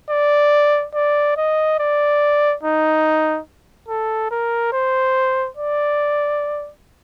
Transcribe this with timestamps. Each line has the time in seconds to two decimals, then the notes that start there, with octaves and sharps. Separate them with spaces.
0.10 D5
0.95 D5
1.37 D#5
1.79 D5
2.63 D#4
3.88 A4
4.31 A#4
4.73 C5
5.57 D5